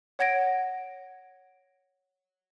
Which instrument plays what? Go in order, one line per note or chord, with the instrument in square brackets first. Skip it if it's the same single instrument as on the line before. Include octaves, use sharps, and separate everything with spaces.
[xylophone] C#5 F#5 G#6 A#6 D7